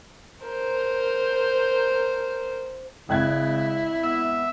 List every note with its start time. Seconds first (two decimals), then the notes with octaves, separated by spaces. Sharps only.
0.43 A#4 C5
3.09 G#1 C#3 E4 F#6 G#6
4.04 B3 E5